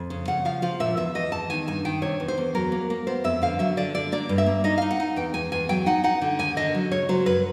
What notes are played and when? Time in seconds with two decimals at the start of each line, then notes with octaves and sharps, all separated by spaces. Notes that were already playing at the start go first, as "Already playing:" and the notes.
Already playing: F2
0.10 C#3
0.28 C#3 F#5
0.45 F3 F5
0.62 F3 F5
0.80 A#2 E5
0.97 E2 E5
1.15 E2 D#5
1.32 E2 A5
1.50 D#3 G#5
1.67 G2 G#5
1.85 D#3 G5
2.02 C3 C#5
2.20 E2
2.28 C5
2.38 E2
2.55 F#3 A#4
2.72 A#3
2.90 A#3
3.07 B3 C5
3.24 F2 E5
3.42 D3 F5
3.59 F#3 E5
3.77 D3 D5
3.94 D3 D5
4.12 A#3 D5
4.29 G2
4.38 E5
4.46 A#3
4.64 D#4 D#5
4.78 D#4 F5
4.91 F#5
5.00 D#4
5.16 E2 G5
5.34 E2 G#5
5.52 E2 G#5
5.69 F#3 G5
5.86 D#4 F#5
6.04 D#4 F#5
6.21 D3
6.39 D#2 G#5
6.57 D3 D#5
6.75 F#3
6.91 C#3 C#5
7.09 F#3 C5
7.26 F#2 B4